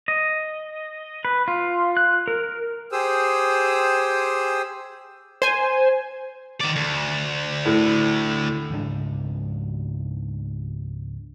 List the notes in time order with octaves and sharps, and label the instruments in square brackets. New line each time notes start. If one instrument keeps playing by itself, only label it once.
[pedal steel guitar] D#5
B4
F4
F#6
A#4
[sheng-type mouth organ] G4 G#4 C5 D#6 E6
[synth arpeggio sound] C5 G#5
[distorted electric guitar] D#3 D5
D2
[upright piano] A2
[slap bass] C#2 G#2 D4